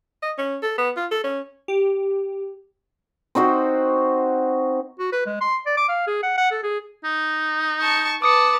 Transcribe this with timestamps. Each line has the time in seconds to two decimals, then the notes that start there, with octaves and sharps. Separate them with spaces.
0.22 D#5
0.38 C#4
0.63 A4
0.78 B3
0.97 F4
1.11 A4
1.24 C#4
1.68 G4
3.35 C4 D#4 F#4 C5
4.99 F#4
5.12 B4
5.26 G#3
5.41 C6
5.66 D5
5.77 D6
5.89 F5
6.07 G#4
6.23 F#5
6.38 F#5
6.51 A4
6.63 G#4
7.04 D#4
7.81 A5 C#6
8.22 B4 A5 D6 D#6 C#7